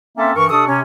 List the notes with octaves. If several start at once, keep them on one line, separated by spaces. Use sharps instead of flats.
A#3 C4 C#4 A4 E5
G2 E3 A#4 C#6
C3 D4 A4 C#6 D#6
C3 C#4